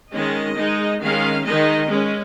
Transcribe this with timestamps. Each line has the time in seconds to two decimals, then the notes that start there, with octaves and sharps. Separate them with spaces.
0.12 D#3 G#3 C#4 D#5
0.57 G#3 D#4
1.01 D#3 G#3 C#4 F5
1.45 D#3 G#3 D#4 D#5
1.89 G#3 C#4